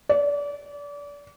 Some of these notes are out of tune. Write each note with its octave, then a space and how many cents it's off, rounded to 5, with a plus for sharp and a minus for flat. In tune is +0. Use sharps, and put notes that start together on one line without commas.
D5 -30